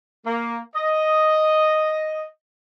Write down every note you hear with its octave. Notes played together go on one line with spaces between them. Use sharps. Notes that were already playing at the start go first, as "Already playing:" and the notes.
A#3
D#5